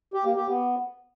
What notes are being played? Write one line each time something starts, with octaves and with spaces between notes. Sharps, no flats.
G4
A#3
G4
B3